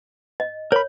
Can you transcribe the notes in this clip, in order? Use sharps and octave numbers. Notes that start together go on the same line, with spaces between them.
D#5
A#4 C#5 B5